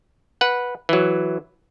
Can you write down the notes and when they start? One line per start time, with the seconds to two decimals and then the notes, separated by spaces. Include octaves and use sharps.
0.41 B4 F#5
0.89 E3 F#3